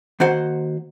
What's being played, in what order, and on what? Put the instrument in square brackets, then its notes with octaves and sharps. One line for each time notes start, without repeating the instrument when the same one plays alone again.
[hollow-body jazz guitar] D#3 A#3 F#4 C5 F#5